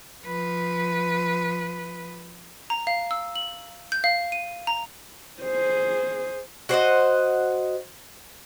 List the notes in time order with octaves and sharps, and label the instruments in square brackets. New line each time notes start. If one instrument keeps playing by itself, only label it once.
[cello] F3 B4
[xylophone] A#5
F5
E6
F#7
G6
F5
D#7
A#5
[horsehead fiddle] G#4 C5
[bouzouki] F#4 C5 D5 D#5